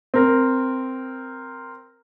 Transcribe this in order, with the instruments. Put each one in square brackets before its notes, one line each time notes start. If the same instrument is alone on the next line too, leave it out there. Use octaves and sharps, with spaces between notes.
[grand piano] C4 A#4